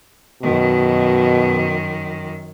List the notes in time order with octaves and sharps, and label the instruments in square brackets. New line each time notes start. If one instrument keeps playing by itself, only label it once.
[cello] F#2 D#3 [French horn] B2